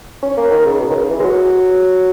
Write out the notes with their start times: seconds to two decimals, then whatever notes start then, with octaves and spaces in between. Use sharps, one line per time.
0.23 C#4
0.37 A#3
0.51 D#3
0.66 C#3
0.81 B2
0.90 D#3
0.95 C#3
1.10 E3
1.20 G#3
1.24 F#3